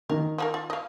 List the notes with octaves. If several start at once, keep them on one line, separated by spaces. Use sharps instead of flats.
D#3 A#4
F3 F4 A#4
F4
D#5 F5